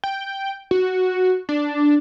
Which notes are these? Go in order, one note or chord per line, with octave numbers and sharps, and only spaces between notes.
G5
F#4
D4